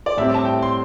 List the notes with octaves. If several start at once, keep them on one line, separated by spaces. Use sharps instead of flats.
D5
A2 G3 C4 E5
A5
G5
C6